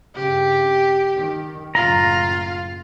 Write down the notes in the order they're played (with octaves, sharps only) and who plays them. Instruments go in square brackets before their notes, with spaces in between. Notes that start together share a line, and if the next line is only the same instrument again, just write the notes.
[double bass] G2 C#3 [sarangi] G4
[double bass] D#3
[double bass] F#1 A2 [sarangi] F4 [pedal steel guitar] A#5